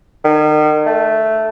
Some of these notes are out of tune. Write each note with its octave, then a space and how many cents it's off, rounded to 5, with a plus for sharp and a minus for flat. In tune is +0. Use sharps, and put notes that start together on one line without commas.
D#3 -35
A3 +0